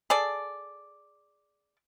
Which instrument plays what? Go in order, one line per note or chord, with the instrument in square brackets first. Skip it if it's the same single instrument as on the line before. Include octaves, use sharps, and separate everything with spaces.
[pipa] G#4 A4 D5